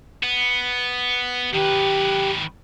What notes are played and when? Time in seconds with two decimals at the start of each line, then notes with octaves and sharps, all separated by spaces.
0.23 B3
1.54 D#3 G4 B4